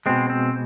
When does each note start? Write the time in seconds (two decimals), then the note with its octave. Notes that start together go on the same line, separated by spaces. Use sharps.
0.06 B2 G#3 C4
0.30 C4